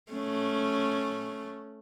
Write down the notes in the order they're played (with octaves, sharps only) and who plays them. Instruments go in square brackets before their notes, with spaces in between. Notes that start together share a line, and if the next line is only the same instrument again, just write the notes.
[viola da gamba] A3 C#4